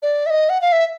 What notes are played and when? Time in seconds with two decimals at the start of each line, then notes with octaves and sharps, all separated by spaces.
0.03 D5
0.26 E5
0.30 D#5
0.49 F#5
0.61 F5
0.72 E5